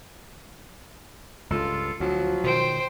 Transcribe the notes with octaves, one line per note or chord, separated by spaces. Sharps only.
C#2 G2 F4 A4
D2 F3 F#3
B2 D#3 C5 G5